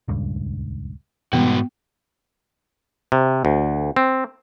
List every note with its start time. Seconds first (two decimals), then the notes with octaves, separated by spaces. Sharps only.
0.08 D#1 C#2 G2
1.33 G#2 B2 E3 G3 B3 F#4
3.12 C3
3.45 D2
3.96 C4